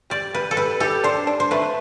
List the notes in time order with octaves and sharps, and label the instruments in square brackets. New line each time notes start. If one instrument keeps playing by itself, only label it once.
[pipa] G3 [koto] D5
[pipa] G3 [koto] B4
[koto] A4
[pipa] G3 [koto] B4
[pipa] G4 [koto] A4
[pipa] D4 [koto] C5
[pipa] D4
[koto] C5
[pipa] A3 [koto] B4